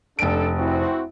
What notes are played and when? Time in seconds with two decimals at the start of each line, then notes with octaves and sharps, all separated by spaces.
0.19 F1 D4 A4 D7
0.58 C4 E4 F#4